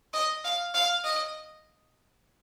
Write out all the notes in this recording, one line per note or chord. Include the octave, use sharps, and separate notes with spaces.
D#5
F5
F5
D#5